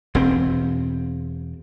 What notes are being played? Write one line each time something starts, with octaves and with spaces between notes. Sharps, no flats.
E1 C4